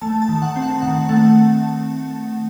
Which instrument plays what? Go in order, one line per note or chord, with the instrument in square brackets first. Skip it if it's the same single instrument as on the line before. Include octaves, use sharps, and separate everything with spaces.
[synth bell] A3 A5
A5
D#3
F#5
C4
F#5
D#3 F#5
A3 F#5